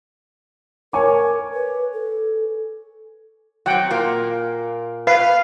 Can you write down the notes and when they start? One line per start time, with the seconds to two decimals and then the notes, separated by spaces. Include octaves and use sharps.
0.93 A#4 C#5 G#5 D6
1.54 B4
1.93 A4
3.66 F#3 C4 F#5 G5
3.91 A#2 A#3
5.07 B4 F5